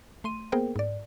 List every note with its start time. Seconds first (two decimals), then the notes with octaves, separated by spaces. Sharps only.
0.24 A3 C6 D#7
0.52 A#3 B3 G#4 A#4 C5 G5
0.76 G#2 D5